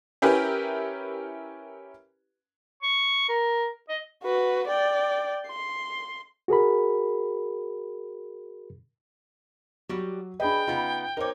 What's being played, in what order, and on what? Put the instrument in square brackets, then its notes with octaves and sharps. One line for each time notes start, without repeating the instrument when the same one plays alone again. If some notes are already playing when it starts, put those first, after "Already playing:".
[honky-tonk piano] C#4 E4 G4 A#4 B4
[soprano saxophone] C#6
A#4
D#5
[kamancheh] F#4 B4
D5 G5
C6
[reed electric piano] F#4 G#4 A#4 B5
[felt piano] F#3 [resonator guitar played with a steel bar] G3 F#4 G4
[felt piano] D4 G#4 D#5 [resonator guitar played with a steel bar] B4 [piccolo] G5
[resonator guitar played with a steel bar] C#3 B3 D#4 [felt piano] F4
[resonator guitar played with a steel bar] D#4 C#5 [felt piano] A#4 C5 D6